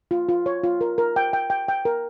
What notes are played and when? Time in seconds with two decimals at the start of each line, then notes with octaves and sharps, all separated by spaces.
0.11 F4
0.29 F4
0.46 C#5
0.64 F4
0.81 A#4
0.98 A#4
1.16 G5
1.33 G5
1.50 G5
1.68 G5
1.85 A#4